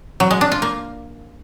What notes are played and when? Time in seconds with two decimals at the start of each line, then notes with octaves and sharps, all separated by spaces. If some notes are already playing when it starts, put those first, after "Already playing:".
0.20 F#3
0.31 G#3
0.41 D4
0.52 F4
0.62 A#3